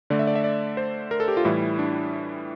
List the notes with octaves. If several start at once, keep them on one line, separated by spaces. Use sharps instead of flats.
D3 A3 D5
E5
D5
E5
D5
C5
A#4
A4
G4
F4
A2 E3 G3 E4
D4